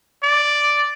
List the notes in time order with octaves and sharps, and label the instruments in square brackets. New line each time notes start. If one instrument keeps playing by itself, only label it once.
[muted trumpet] D5